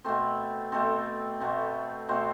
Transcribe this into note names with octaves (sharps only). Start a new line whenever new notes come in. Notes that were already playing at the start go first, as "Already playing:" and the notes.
B2 A3 C4 A4
B2 A3 C4 A4
B2 A3 C4
B2 A3 C4 C5